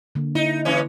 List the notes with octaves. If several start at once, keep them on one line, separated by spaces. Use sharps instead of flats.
D3 A#3
D#4 E4
G#2 E3 C#4